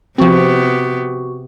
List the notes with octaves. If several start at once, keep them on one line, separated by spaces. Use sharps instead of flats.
C3 F3 B3 C4 F#4 G4 C#6